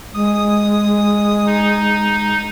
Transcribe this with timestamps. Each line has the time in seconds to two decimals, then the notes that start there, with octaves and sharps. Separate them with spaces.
0.14 G#3 D#6
1.47 D#4